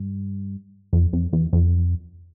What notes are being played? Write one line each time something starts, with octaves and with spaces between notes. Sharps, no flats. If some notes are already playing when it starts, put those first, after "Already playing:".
Already playing: G2
F2
F2
E2
F2